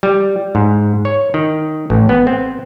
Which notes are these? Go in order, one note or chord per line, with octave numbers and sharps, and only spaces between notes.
G3
G#2
C#5
D#3
A1
B3
C4